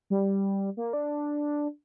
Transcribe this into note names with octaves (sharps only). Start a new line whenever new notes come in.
G3
A#3
D4